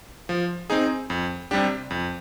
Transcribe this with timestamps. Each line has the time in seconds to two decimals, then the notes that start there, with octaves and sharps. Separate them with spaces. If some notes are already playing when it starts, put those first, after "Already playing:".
0.29 F3
0.70 C4 D#4 G#4
1.10 F2
1.51 C3 G3 D4 G4
1.91 F2